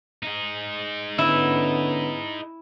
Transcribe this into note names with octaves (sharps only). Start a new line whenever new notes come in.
D#4 G#4
D3 B3 C#4 E4